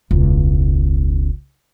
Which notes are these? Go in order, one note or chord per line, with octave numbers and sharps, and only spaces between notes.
E1 C#2